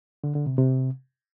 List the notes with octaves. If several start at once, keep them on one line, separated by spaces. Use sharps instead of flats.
D3
D3
C3
C3